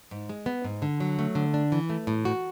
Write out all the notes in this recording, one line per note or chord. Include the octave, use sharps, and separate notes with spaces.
G#2
G#3
B3
G#2
D3
F#3
A3
D3
D4
E3
A3
A2
F#4